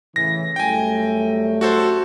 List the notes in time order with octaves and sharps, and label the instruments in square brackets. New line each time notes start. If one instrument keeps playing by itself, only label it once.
[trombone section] A2 C#3 E3 [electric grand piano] A#6
[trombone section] F#2 G3 A3 [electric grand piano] G5 G#5
[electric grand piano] F#4 A4 C5